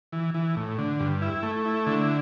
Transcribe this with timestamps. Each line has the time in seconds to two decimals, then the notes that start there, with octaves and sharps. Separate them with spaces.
0.13 E3
0.34 E3
0.57 A2
0.78 D3
1.00 G2
1.22 E4
1.43 A3
1.65 E4
1.87 D3